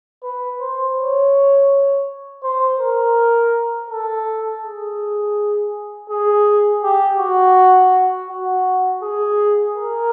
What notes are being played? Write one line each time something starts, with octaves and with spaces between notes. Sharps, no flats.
B4
C5
C#5
C5
A#4
A4
G#4
G#4
G4
F#4
F#4
G#4
A#4